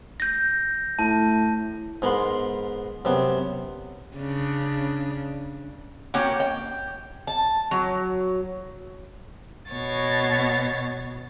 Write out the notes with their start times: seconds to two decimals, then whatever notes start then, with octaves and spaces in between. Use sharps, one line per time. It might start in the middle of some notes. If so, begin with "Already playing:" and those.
0.20 G6 A#6
0.99 A2 A5
2.02 G#2 B3 A#4 B5 C6
3.05 F#2 C3 B3
4.17 C#3 D4
6.14 A#3 C#4 F#4 G4
6.40 G5
7.27 A5
7.71 F#3
9.72 B2 C#5 A6